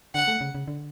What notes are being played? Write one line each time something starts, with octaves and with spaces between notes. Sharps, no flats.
D3 F#5
A3
C#3
C#3
D3